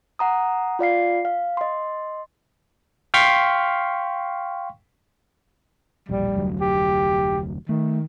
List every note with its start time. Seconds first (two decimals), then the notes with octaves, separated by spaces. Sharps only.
0.19 F#5 A#5 D#6
0.79 F4 D5 F5 C7
1.25 F5
1.57 D#5 C6
3.14 F5 G5 C6 C#6 F6 B6
6.09 E1 A#1 G3
6.34 F1 D2 F#3
6.61 G4
7.69 D#3 A3